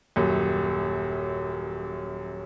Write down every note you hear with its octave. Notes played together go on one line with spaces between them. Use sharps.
D#1 F#2